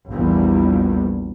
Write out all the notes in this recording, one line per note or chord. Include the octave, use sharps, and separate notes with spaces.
A#1 E2 G3